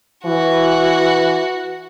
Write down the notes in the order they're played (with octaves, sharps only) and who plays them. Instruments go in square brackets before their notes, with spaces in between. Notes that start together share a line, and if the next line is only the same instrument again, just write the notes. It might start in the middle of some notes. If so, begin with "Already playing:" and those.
[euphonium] E3 [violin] F#4